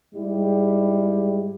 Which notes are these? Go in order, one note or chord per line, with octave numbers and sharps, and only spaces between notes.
G#2 G3 G#3 E4 G4